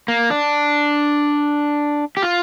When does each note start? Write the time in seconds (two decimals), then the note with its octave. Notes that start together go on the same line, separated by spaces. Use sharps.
0.08 A#3
0.30 D4
2.17 G4
2.23 F4